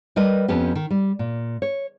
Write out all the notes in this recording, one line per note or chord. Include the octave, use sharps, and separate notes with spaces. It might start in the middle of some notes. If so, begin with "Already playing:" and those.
G3 A#4 B4 D#5
F2 F3 B3 C#4 G4
D#3
G3
A#2
C#5